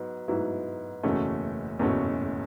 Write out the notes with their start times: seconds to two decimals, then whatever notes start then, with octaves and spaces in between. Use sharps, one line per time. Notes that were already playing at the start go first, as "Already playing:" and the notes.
Already playing: G#2 F#3 B3
0.28 G#2 F#3 B3 E4
1.03 F#1 E2 B2 A3 C#4
1.79 F#1 E2 B2 A3 C#4